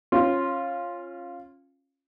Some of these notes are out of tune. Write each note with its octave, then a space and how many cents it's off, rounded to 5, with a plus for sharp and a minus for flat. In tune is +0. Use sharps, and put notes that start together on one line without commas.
C#4 -20 F4 +0